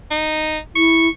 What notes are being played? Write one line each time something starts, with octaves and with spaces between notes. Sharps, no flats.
D#4
E4 C#6